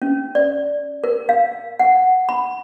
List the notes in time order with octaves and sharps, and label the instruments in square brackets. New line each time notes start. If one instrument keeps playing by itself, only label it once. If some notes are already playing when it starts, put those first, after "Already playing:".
[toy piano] C#4
D5
A#4
F5
F#5
B5